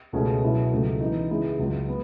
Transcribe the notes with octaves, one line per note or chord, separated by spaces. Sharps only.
C#2 B2 A3 C#4 G#4
B2 F#3 C#4 E4
C#2 C#3 F#3 A3
E3 B3 D#4
C#3 G#3 B3 E4 G#4
C#2 C#3 F#3
B3